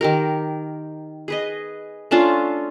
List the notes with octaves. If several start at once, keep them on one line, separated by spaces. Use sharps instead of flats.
D#3 G4 A#4
G#4 B4 D#5
A3 C#4 D4 F4